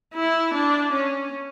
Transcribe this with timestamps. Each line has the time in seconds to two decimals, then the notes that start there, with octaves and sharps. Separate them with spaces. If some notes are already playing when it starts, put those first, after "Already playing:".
0.14 E4
0.53 D4
0.92 C#4